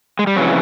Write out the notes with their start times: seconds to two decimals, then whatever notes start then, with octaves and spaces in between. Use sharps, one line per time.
0.19 G#3
0.27 G3
0.36 F2 C#3 E3 F#3